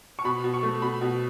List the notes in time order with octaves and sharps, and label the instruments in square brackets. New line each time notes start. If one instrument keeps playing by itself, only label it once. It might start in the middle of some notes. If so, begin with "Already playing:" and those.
[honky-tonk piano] C#6
B2 B5
B2
C#6
A3
B2 B5
B2